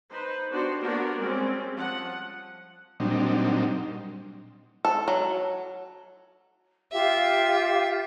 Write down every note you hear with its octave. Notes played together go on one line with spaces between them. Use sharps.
D#4 B4 C5
B3 D4 F#4 G4 C5
A#3 B3 D4 F#4 A#4
G3 G#3 C4 C#4
F3 F#5
A#2 F#3 G3 C4 D4 D#4
A4
F#3
F4 G4 E5 F5